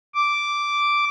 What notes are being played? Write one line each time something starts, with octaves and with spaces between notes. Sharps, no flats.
D6